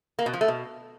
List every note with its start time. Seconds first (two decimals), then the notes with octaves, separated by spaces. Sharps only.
0.19 A#3
0.26 B2
0.33 F3
0.41 A3
0.48 B2